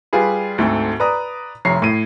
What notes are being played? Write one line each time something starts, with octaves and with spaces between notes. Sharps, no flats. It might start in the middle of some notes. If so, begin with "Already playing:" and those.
G3 F4 G#4 B4
D2 G#2 A3 C4
B4 D5 A#5 D#6
F1 C3 C#5 A#5 C7
A2 D#7